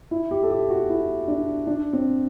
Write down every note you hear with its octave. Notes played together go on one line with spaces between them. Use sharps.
E4
G4
A4
G4
F#4
E4
D4
D4
C4